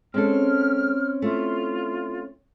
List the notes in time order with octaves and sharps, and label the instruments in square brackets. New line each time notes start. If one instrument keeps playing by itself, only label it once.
[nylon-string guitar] G#3 A4 [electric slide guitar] C4 C#4 [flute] F6
[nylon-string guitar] A3 E4 [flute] F4